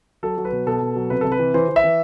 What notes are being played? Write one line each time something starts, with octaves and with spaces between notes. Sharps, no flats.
F#3 A4
F#3
B4
B2
B2 A4
B2
F#3
C3 B4
C3 A4
B4
E3
E3 C5
E3
E5
E3